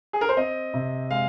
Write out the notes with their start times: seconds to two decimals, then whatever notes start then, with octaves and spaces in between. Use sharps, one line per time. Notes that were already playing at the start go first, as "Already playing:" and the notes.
0.13 G#4
0.21 A#4
0.29 C5
0.37 C4 D#5
0.74 C3
1.10 G#3 F5